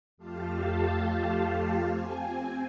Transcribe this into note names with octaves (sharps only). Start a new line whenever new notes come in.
F2 A3 F4 G4 F5 A5
C4 G#5